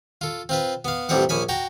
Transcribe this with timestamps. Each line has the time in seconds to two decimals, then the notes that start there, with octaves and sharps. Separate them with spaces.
0.21 F4 A4
0.49 C4 F4 B4
0.85 B3 F5
1.09 A1 C3 G3 C4 F4 F#5
1.29 A#1 C#4 G#5 B5
1.49 F#4 G5 A5 A#5